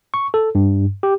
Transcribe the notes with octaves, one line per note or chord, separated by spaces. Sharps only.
C#6
A4
G2
G4